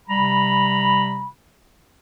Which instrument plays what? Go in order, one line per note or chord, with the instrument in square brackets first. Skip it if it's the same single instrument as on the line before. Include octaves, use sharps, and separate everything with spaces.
[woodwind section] C3 G3 A#5 B5